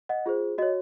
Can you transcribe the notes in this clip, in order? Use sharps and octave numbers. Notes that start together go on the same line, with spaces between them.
D#5 F#5
F4 G#4 C5
F#4 C#5 D#5